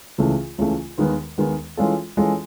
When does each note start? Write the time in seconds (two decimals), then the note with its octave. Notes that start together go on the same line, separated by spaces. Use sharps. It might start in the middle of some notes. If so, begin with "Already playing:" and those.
0.18 C#2 C#3 E3 A3
0.58 C#2 C#3 E3 A3
0.98 D#2 D#3 G#3 B3
1.38 D#2 D#3 G#3 B3
1.77 E3 G#3 C#4 F4 A4
2.17 E3 G#3 C#4 F4 A4